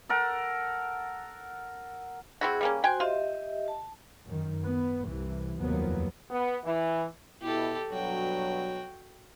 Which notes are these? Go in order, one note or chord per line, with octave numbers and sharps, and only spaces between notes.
A4 A#4 F#5
C4 E4 F#4 G#4
G3 A#3 C#4
F#4 C5 G5 G#5 C6
F4 G4 D#5 E5
A5
F#2 D#3
B3
C2 C3 E3
F1 D#2 F3 F#3 A#3 B3
B3
E3
B2 E4 G4 A4
G2 B2 F#3 F#4 G5